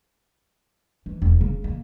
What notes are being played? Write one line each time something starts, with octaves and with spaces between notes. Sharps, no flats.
E3
E1
C#3
A#3